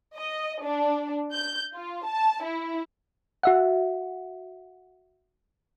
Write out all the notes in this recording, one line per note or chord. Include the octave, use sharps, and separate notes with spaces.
D#5
D4
G6
F4
A5
E4
F#4 E5 F#5